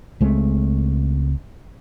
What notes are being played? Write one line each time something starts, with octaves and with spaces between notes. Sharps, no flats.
C#2 G#3 A3 C4